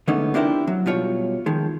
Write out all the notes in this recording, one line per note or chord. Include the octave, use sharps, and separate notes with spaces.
D3 G#3 A3 B3 C#4 D#4
C4 D4 E4 G4 A#4 C5
F#3
B2 G3 F4 C#5
D#3 F3 G#3